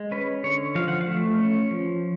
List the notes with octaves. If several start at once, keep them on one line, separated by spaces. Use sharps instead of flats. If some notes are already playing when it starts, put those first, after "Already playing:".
Already playing: G#3
C#4 B4
D3 C#5
F3 F5
F#5
F5
A3
C#4
F3